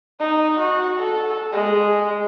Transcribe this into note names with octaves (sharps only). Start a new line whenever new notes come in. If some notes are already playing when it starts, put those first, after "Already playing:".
D#4
F#4
A4
G#3